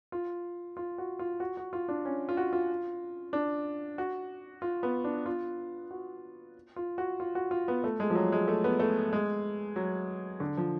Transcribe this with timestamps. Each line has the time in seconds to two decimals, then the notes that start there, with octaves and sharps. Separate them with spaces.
0.12 F4
0.77 F4
0.98 F#4
1.19 F4
1.40 F#4
1.57 F#4
1.73 F4
1.88 D4
2.05 C#4
2.29 F4
2.37 F#4
2.53 F4
3.33 D4
3.98 F#4
4.62 F4
4.83 B3
5.04 D4
5.26 F4
5.91 F#4
6.76 F4
6.98 F#4
7.20 F4
7.35 F#4
7.51 F4
7.68 B3
7.84 A3
8.00 G#3
8.10 F3
8.15 F#3
8.32 G#3
8.48 A3
8.64 B3
8.80 A3
9.13 G#3
9.76 F#3
10.40 D3
10.57 F3